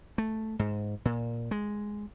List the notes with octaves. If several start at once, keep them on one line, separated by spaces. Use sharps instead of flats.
A3
G#2
A#2
G#3